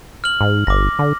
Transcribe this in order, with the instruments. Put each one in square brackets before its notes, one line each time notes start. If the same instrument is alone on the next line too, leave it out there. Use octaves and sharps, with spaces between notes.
[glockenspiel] F6 F#7
[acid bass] G#2
[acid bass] G1 [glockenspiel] D6 A#6
[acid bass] D3